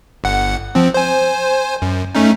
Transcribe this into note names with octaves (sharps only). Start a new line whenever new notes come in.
G1 F#5
F3 C4
C5 G#5
F#2
A3 C#4 D#4